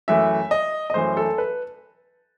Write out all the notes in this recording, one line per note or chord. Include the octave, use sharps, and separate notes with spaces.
F#2 E3 A3 E5
D#5
D#5
F#2 E3 A3 C5
A4
B4